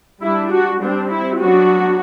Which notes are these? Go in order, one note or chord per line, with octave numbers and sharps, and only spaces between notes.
G3 D4 E4
F#4
G3 C4 D4
E4
F#3 B3 D4 F#4